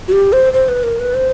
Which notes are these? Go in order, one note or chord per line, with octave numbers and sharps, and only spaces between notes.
F#4
G4
C5
C5
B4
A#4
B4
C5